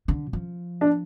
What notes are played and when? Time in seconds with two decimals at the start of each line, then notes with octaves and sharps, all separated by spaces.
0.08 D3
0.33 F3
0.81 D4